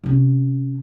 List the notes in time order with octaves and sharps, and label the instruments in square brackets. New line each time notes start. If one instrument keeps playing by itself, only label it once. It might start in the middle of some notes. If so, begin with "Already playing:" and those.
[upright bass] C3 C#4